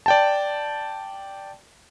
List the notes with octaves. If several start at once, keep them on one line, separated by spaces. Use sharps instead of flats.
D5 G5 A5